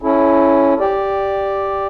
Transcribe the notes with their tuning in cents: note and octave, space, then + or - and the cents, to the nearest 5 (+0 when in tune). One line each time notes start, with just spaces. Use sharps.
C#4 +0 E4 +0 A4 -30
G4 +0 D5 +0